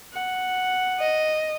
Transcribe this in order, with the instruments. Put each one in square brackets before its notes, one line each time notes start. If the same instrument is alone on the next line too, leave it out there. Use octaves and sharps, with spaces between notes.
[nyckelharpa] F#5
[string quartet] D#5